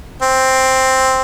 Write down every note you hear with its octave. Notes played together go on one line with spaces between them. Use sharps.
C4